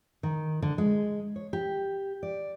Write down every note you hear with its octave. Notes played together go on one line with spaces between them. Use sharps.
D#3
D3
G#3
C#5
G4
D5